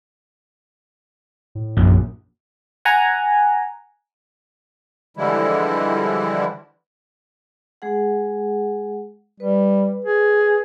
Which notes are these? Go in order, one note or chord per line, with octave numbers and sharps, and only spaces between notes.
A2
A#1 F#2
F#5 G#5 A#5
D3 E3 F3 G3 G#3 E4
G#3 G#4 F#5
G3 B4
G#4